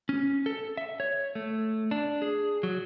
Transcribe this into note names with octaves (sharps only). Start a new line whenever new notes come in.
C#4
A4
E5
C#5
A3
D4
G#4
F#3